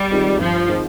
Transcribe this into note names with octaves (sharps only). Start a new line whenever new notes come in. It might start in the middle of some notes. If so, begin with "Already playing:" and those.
Already playing: G3
D#3 G#3 C4 F4
G2 F3
D#3 G#3 C4 F4